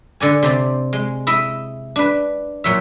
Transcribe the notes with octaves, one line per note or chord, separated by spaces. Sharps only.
D3 D5 G#5
C3 C5 D5
G#3
E4 D#5 E5
D4 B4
A#2 F#3 E5